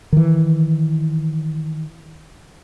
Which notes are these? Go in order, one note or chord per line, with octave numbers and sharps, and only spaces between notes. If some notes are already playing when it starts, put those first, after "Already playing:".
D#3 E3